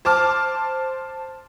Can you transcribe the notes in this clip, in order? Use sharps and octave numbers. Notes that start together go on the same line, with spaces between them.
C5 A5 D6 F6